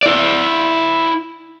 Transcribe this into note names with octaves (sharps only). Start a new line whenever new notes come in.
E4 D5